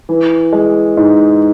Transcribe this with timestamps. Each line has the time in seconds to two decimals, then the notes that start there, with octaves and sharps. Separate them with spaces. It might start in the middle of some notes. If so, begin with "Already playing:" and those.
0.09 E3
0.52 G#3
0.97 G#2